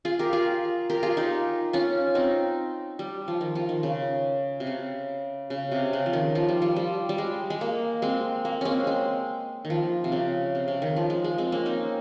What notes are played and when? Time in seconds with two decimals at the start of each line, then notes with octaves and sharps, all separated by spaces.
0.05 F4 G#4
0.19 G4 A#4
0.33 F4 G#4
0.90 G4 A#4
1.03 F4 G#4
1.17 D#4 G4
1.73 C#4 F4
2.15 C4 D#4
2.99 G3
3.28 F3
3.41 D#3
3.55 F3
3.69 D#3
3.83 C#3
4.60 C3
4.67 C#3
5.50 C#3
5.71 C3
5.93 C#3
6.06 F3
6.13 D#3
6.35 F3
6.48 G3
6.62 F3
6.76 G3
7.09 G3
7.18 G#3
7.50 G#3
7.61 A#3
8.02 G#3 C4
8.45 A#3
8.61 G#3 C4 C#4
8.87 G#3
9.65 D#3
9.70 F3
10.04 C3
10.12 C#3
10.55 C3
10.68 C#3
10.82 D#3
10.96 F3
11.10 G#3
11.24 G#3
11.38 G#3 C4
11.52 A#3 C#4
11.66 C4 D#4